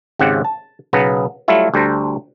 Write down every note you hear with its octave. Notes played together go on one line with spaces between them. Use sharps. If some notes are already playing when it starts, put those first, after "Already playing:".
G#1 G#2 C#3 C4 G4 F#5
A5
B1 C#3 B3 A#5
F#3 G3 A3 E4 F4
D2 G3 A4 C5 A#5